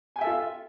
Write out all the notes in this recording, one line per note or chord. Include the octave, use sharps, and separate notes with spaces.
F4 A4 E5 G5 G#5